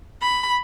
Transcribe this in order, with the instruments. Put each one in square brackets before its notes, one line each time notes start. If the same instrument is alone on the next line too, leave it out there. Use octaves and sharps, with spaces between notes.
[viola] B5